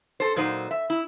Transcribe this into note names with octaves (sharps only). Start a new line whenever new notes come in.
A4 C5
A#2 F#3 D#4 C5
E5
E4